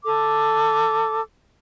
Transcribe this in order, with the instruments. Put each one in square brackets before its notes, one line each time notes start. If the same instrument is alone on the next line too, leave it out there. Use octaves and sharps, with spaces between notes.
[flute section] A4 D6